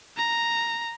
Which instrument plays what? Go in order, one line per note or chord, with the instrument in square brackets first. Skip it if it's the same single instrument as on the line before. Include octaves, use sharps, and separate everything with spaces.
[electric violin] A#5